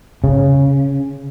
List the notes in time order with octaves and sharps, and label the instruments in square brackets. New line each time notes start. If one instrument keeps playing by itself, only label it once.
[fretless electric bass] C#3